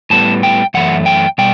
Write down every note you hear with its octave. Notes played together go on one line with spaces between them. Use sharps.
A2 G3 B3 A5
G5
F#2 E3 A3 F#5
G5
B2 G3 G5